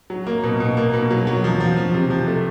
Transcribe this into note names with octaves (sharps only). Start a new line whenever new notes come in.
F#3
A#3
B2
B2
A#3
B2
F#3
F#3
F3
F3
F3
C3
F3
A3